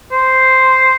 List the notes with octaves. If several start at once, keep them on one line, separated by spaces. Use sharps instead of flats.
C5